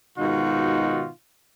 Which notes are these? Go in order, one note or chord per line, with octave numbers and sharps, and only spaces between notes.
G#2 B2 D#3 D#4 F4 F#4